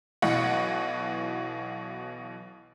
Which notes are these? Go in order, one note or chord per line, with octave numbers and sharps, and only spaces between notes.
B1 B2 E3 F#5